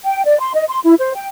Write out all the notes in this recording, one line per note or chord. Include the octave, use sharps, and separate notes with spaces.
G5
D5
C6
D#5
C6
E4
C5
G5